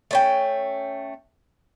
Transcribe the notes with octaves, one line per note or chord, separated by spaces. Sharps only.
A3 C#4 G5